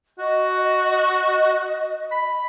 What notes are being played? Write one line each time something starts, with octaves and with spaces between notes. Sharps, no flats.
F#4 D#5
B5